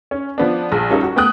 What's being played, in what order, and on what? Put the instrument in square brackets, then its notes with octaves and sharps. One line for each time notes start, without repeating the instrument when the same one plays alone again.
[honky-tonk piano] C#4
F3 B3 D4
A#1
G3 C#4 D#4 F4 A4 A#4
F#4
A3 B3 G5 D#6 F#6